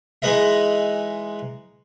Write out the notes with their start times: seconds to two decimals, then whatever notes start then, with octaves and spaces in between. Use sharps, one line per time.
0.22 E3 G#3 D#4 B4 D#5 E5